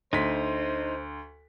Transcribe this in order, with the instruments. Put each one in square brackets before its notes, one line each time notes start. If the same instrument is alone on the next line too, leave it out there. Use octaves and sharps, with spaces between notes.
[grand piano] D2 B6 [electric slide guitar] D#4 [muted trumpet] C5